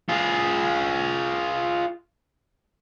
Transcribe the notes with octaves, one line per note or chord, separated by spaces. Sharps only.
F4 G#4